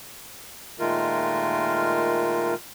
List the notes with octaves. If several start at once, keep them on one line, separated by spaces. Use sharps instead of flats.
A#2 D#3 G#3 A3 F4 A#4